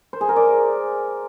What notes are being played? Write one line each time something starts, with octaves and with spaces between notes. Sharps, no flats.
C5
G#4
A#4
D5